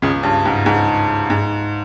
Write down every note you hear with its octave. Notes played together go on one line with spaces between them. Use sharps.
C#2 C#3
G2
G#2
G#2
G#2